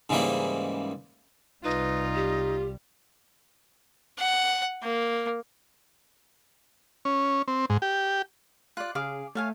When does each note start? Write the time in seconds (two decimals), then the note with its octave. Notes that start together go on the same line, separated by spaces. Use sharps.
0.09 G#2 C#3 E3 G3 A#3
1.64 C2 G3 D#4 F4 B4
2.15 G4
4.18 F#5
4.83 A#3
7.05 C#4
7.48 C4
7.70 G#2
7.82 G4
8.77 F4 D5 F#6
8.95 C#3 G#4 F5 D6
9.35 A3 C#5 F5 G#5